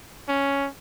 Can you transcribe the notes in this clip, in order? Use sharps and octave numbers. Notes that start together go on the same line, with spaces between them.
C#4